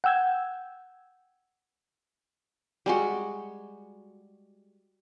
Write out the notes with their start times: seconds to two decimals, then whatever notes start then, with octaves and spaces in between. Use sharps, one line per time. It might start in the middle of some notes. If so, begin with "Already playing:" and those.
0.04 F#5 G5 E6 G6 G#6
2.86 G3 G#3 F#4